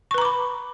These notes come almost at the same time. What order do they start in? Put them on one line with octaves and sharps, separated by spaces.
C#6 B4 A#5 D6 B5